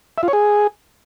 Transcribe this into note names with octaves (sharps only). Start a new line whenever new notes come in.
E5
F4
C#5
G#4